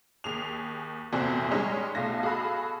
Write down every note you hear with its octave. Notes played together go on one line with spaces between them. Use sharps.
D#2 G#4 F7
F1 E2 A#2 C4 F#4
G3 G#3 C#4 D#4
B1 A3 F4 A#6
F#4 G#4 A4 F5 B5 E6